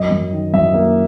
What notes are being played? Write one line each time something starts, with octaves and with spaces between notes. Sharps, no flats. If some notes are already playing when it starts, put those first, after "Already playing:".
Already playing: F#2 D#5
F#2
D#3
F#2 E5
A#3